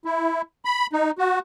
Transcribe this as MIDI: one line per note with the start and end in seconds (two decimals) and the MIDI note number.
0.05 0.42 64
0.65 0.87 83
0.93 1.11 63
1.18 1.39 66